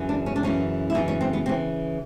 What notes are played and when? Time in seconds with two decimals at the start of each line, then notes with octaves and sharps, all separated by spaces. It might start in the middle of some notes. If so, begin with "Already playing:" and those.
Already playing: F#2 C#3 E3
0.09 D4
0.26 C#4
0.36 D4
0.43 F#2 C#3 E3 C#4
0.90 E4
0.94 F#2 C#3 E3 D#4
1.08 C#4
1.21 C4
1.33 B3
1.46 C#3 E3 C4